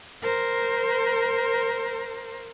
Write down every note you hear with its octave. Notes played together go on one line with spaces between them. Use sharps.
A#4 C5